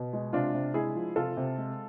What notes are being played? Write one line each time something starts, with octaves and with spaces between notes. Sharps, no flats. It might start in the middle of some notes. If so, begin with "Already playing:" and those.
Already playing: B2
G#3
C3 D4 F4
C3
G#3 E4 G#4
F3
C3 F4 A4
C3
G#3